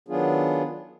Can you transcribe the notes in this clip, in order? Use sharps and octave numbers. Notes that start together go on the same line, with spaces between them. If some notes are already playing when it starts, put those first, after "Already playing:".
D#3 F#3 B3 D4 F4 G#4